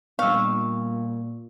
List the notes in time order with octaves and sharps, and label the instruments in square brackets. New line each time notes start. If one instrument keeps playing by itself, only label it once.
[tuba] A#2 [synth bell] G3 B3 [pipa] F5 [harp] C#6 E6